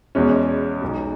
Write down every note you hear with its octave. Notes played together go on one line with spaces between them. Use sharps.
E2 B2 G#3 C#4
B1 B2 G#3